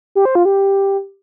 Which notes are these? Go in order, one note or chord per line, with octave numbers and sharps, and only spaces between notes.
G4
C5
F4
G4